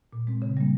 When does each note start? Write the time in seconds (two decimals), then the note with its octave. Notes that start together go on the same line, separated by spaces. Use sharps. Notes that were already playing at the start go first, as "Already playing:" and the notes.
0.13 A#2
0.27 G#3 C4
0.42 C#3
0.57 G3 A#3